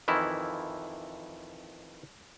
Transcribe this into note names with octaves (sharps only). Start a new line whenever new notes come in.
F2 D#3 E3 E4